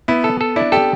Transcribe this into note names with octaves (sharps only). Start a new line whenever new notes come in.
B3 E4
A4
A4
D4 E4
G4 A4